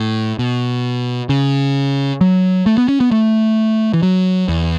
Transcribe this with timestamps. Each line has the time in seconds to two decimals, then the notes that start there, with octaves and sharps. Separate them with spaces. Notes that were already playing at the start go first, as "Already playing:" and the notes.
Already playing: A2
0.39 B2
1.29 C#3
2.21 F#3
2.66 A3
2.78 B3
2.88 C#4
3.00 B3
3.11 A3
3.94 E3
4.03 F#3
4.48 E2